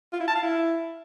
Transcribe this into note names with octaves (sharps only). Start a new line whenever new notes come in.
F4
E4
A5
F5
E4